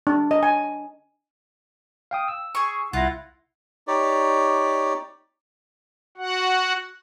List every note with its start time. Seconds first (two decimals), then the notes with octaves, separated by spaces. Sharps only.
0.07 D4
0.31 D#5
0.43 G#5
2.11 F5 G5 D#6
2.28 E6
2.55 G#4 C#6
2.93 C2 E4 F4 F#5 A#6
3.88 D#4 G4 C#5 D5
6.17 F#4 F#5